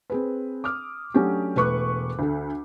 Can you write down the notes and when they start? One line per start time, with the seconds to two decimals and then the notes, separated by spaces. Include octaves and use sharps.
0.10 C4 G#4 B4
0.64 D6 D#6 F6
1.14 F#3 A3 C#4 D4 F#4 G4
1.56 E1 A3 B4 C#6 D6 F#6
2.19 D2 A4